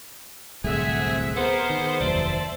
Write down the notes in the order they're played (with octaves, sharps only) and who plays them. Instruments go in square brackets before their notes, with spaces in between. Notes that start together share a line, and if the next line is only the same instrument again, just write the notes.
[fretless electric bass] D1 C2 A3 [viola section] C4 E5 F#5 [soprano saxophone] G#4
[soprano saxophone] B3 [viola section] G#4 A#4 [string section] C5
[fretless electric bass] D#3
[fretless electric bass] F1 D#2 F#3 [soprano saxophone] D5 [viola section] E5 A5